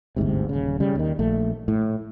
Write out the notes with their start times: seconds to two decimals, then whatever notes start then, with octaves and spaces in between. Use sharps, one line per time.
0.16 G1 D2 G#2 C3
0.49 D#1 C#3
0.80 C#3 G3
0.95 D#2 D#3
1.19 A#1 A3
1.68 A2